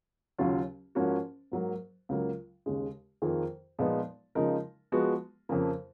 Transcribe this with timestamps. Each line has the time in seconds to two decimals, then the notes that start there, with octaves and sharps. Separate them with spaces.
0.38 D#2 C#3 F#3 C#4 F4
0.95 G#2 F3 A#3 C#4 F#4
1.52 G#2 F#3 A#3
2.09 C#2 C#3 F#3 A#3
2.66 D#2 C#3 G#3
3.22 F2 D#3 A#3 F4 G#4
3.79 A#2 F3 G#3 B3 D#4
4.35 C#3 F3 G#3 D#4 A#4
4.92 F3 G#3 B3 F#4
5.49 F2 C#3 F3 A#3